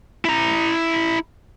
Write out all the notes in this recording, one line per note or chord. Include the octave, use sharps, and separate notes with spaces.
E4 A#5